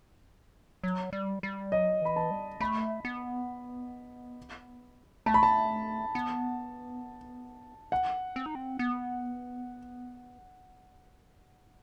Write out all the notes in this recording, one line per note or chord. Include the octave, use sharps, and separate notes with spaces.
F#3
G3
G3
F#3 D#5
E3 B5
A5
G3
A3 B5
B3
A3 A5
B5
A5
B3
F#5
C4
D#4
C4
B3